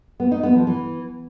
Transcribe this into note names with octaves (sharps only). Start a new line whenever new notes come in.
B3
D#4
B3
F3
E3